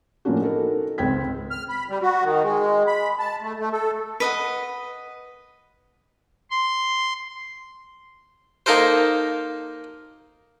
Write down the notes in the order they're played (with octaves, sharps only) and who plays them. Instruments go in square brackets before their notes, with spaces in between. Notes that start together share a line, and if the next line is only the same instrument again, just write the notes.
[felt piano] A2 F3 A#3 C#4 D4 F#4
D#4 F#4 A4 A#4
G#1 C#2 C4 G5 G#6 B6
[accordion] F6
B5
G3
F#4
D#3
G#3
B5
A5
A3
A3
A4
[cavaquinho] B4 D#5 F#5
[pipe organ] C6
[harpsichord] A#3 D#4 A4 A#4 C5